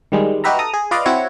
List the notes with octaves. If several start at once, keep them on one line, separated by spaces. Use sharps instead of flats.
D#3 G3 G#3
D#4 F#4 G4 B4 E5 A#5
A4 A#5 D#6
G#4
F4 B4 D5 D#5 F5
C4 E4 F#4 C#5